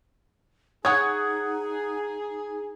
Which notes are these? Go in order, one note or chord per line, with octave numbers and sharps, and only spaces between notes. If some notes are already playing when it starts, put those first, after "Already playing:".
D#4 G#4 C#5 F#5 G#5 D#6 G#6